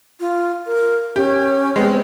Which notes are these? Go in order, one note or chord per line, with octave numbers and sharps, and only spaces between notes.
F4
A#4
C#4 G4
G#3 B3 C4